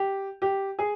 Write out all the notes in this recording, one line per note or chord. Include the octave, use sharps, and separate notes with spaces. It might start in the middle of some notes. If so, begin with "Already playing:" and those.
Already playing: G4
G4
G#4